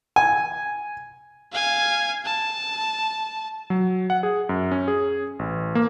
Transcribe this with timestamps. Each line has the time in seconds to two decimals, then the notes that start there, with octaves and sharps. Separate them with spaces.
0.16 G#5
1.52 F5 G#5
2.25 A5
3.70 F#3
4.10 F#5
4.23 G#4
4.49 F#2
4.71 C#4
4.88 G#4
5.39 A1
5.75 A#3